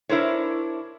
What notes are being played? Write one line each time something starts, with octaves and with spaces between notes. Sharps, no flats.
D4 E4 A#4 C5 C#5